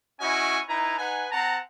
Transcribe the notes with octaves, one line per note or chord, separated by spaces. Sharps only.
C#4 E4 F#4 D#5 G#5 C#6
D#4 E4 B4 G#5 A#5
D#4 B4 F#5 G#5
C4 F#5 A5 A#5